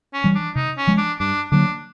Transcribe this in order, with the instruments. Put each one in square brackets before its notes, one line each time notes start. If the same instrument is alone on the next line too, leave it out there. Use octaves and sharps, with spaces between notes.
[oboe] C#4
[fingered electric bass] E3 G3
[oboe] D4
[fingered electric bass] C3 [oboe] D#4
[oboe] C#4
[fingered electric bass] F3 G#3
[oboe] D4
[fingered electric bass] G2 [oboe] D4
[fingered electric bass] D3 F#3 A#3 [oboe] D4